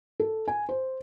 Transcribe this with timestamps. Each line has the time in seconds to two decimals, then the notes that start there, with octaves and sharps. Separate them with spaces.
0.20 A4
0.48 G#5
0.69 C5